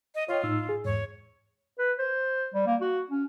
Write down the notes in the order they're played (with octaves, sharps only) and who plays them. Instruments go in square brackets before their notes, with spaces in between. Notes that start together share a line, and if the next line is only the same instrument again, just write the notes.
[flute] D#5
[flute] F4 [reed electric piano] C#5 D#5 G5
[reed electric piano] A2 D#4 E6
G#4
[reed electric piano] E2 G#2 [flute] C#5
[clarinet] B4
C5
G3
A#3
F#4
C#4